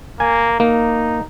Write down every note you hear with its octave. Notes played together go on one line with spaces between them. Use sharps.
A#3 G#5
A#3 D#4